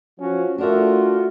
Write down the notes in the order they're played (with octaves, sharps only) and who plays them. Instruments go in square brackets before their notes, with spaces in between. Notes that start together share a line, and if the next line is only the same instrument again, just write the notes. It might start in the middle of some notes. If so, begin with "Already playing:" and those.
[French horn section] F3 [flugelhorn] C#4 [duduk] F#4
[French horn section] A3 [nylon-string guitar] D4 A#4 E5 [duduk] F4 [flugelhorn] F#4